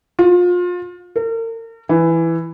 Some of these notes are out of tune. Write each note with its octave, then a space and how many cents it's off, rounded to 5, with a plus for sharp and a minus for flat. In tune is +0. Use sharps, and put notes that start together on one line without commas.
F4 +30
A#4 -40
E3 +5